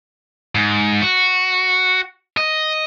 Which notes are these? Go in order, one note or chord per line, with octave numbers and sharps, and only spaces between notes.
G#2
F#4
D#5